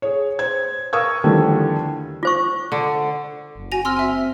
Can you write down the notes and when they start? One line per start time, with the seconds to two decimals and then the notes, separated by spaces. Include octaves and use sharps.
0.02 G#4 C#5
0.39 C5 G#6
0.93 A#4 F5 C#6 D#6 E6 G#6
1.24 E2 D3 D#3 F3 G3 A3
2.23 F4 C5 C#6
2.72 D3
3.56 F#1
3.72 F#4 G#5 A#6 F7
3.85 C4 C6 E6 F6
3.97 E5 G#5